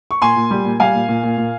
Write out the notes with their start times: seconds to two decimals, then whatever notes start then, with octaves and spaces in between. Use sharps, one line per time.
0.11 C#6
0.22 A#2 G#5 C6
0.36 A#2
0.51 G3
0.65 A#2
0.80 G3 F5 G#5
0.95 A#2
1.09 A#2
1.23 A#2
1.38 A#2